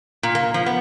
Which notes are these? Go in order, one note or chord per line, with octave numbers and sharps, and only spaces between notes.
A#2
A#3
F3
B3